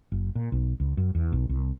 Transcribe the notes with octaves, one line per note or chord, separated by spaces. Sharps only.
F#1
A#2
B1
C#2
F#2
E2
B1
C2